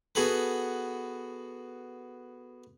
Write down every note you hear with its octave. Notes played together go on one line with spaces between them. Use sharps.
B3 F#4 G#4 A4 B4